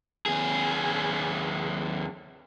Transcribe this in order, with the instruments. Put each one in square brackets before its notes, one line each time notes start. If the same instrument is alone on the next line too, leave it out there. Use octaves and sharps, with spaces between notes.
[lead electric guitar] D#2 G#4